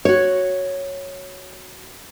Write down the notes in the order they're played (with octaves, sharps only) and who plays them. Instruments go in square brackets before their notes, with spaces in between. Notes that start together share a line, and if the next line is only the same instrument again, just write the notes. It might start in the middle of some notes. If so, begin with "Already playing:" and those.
[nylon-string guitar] F#4 C#5